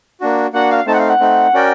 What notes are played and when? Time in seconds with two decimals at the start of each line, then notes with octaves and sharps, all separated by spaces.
0.21 A#3 D4 F#4
0.53 A#3 D4 F#4 F#5
0.71 F5
0.86 A3 C4 D#4 A5
0.93 F#5
0.99 F5
1.09 F#5
1.20 A3 C4 D#4
1.53 C#4 F#4 A#4 D5 G5